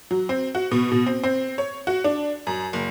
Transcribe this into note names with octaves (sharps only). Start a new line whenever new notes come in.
F#3
C4
F#4
B2
B2
C4
C4
C#5
F#4
D4
F#2
F#1